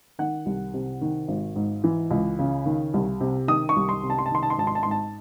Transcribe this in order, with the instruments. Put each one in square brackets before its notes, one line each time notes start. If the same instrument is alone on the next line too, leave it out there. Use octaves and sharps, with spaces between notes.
[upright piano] D#3 F#5
C2
C3
D#3
G#1
G#2
E3
C#2
C#3
D#3
C2
C3
D#3 D#6
C#6
C2
C6
C3
A5
C6
A5
D#3 C6
A5
C6
G#1 A5
C6
A5
G#2 C6
A5